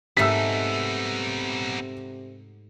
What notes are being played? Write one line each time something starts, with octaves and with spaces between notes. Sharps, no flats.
G#2 C3 A3 B3 D#4 E6 B6